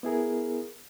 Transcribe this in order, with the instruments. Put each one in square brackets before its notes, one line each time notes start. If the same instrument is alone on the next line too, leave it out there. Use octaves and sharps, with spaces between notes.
[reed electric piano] B3 E4 G#4 A#4